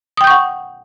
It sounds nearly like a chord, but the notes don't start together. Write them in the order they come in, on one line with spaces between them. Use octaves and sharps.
D#6 G5 G6 C#6 F#5